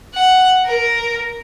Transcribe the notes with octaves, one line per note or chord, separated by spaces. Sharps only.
F#5
A#4